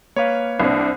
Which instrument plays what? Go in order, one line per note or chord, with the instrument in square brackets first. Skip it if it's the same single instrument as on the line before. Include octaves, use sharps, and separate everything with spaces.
[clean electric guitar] A#3 B4 F5 [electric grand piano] C#5
[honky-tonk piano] C2 C4 [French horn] D4